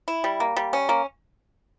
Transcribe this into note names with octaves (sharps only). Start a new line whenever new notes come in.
E4
G3
A#3
G3
C#4
A#3